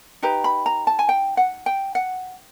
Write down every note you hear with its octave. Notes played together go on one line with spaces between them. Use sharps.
D#4 G4 B4 A#5
B5
A#5
A5
G#5
G5
F#5
G5
F#5